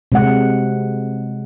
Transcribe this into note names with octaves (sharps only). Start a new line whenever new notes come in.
C3 G#3 F#5